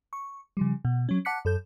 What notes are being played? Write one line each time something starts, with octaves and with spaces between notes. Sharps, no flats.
C#6
C#3 F3 G3
B2
F#3 C#4
F#5 A5 D6 F#6 B6 C#7
F#2 A4 G6